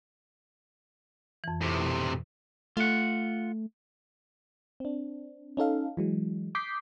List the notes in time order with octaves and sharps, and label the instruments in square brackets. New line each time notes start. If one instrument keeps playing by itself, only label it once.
[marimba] F2 E3
[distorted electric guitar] A2 C3
[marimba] B2
[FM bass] A3 [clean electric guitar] F4 F#5
[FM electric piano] C4 D4
C#4 D#4 A4 F5
E3 F#3 G#3
D6 D#6 G6 B6 C7